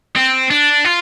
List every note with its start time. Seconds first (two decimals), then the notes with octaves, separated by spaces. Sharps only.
0.16 C4
0.51 D4
0.85 F4